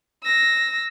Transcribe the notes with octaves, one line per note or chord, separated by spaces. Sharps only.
E6 A#6